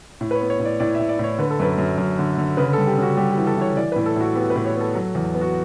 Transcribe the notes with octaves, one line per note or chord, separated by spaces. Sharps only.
A2
B4
C#5
B3
C#5
A2
D5
A2 D5
A2 E5
D5
A2 C#5
D3 B4
A4
F#2 B4
F#2
F#2
D3
D3
C#3 B4
G3 A4
G4
C#3 F#4
G3 G4
G4
E3
A4
E3 C#5
E3 D5
A2 B4
A4
A2 F#4
B3 G4
B4
A2
C#5
B3 A4
F#3
E2
B3
F#4